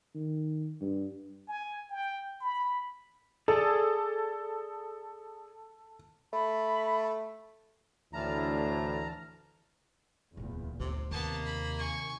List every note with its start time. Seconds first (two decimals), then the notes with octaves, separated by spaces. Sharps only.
0.15 D#3
0.81 G2
1.48 G#5
1.90 G5
2.41 B5
3.48 G#4 A4 D5 G#5
6.33 A3 B5
8.13 D2 A2 E3 D4 E4 A5 A#5 F6
10.37 D1 E2 A#2 F#3
10.80 G1 D2 C3
11.11 D#2 C3 D#3 A#3 B3 A5
11.46 B5
11.79 G#5 C#6